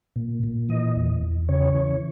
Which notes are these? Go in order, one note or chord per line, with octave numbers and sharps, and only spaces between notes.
A#2
A#2
E3 D#5
E2
E2
C#3 C#5
E3